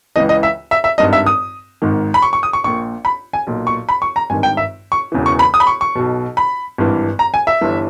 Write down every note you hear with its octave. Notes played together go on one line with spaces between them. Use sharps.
C#2 C#3 E3 D#5
D#5
E5
E5
E5
G#1 G2 D#3 D#5
E5
D#6
G#1 G#2 D#3
B5
C#6
C#6
D#6
C#6
A#1 A#2 C#6
B5
G#5
B1 A#2
C#6
B5
C#6
A#5
G#1 G2 D#3 G#5
G5
E5
C#6
E1 E2 C#3 E3
C#6
B5
D#6
B5
C#6
C#6
B1 B2
B5
G#1 G2 E3
A#5
G#5
E5
G1 G2 E3